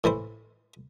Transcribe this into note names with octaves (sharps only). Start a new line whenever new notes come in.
A2 E3 E4 C5